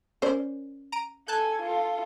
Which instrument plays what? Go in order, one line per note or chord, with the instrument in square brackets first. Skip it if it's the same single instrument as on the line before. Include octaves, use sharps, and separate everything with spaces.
[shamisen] C#4 A#4 D5 [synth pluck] C5
[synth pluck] A#5 D7 D#7
[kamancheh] A4 G#5 [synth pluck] A5 F#6 G6
[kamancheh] F4 A4